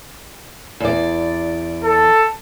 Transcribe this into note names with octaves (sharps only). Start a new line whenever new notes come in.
E2 D5
A4